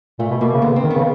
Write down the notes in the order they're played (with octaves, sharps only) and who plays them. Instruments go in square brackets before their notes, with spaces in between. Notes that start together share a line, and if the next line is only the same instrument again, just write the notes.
[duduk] A#2 [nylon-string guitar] A3
[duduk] B2
[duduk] B2 [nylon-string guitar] A#3
[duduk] C#3
[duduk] D3 [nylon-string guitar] B3
[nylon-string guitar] C4
[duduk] D#3
[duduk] C#3 [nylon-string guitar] B3